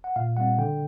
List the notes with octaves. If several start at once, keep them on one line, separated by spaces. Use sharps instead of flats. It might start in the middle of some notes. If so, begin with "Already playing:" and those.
F#5
A#2 F5
G3 C4 F#5
D3 G5